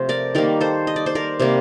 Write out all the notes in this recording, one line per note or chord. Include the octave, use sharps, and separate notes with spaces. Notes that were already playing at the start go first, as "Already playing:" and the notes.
Already playing: C3 F3 A3 C5
A#4 D5
D#3 G3 A#3 A#4 D5
A4 C5
D#5
D5
C5
A#4 D5
C3 G3 A#3